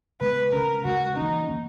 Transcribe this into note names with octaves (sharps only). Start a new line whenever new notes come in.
C#3 G#3 B3 B4
C#3 G#3 C#4 A#4
C#3 G#3 C#4 F#4
E3 A#3 C#4 D#4
E3 A#3 C#4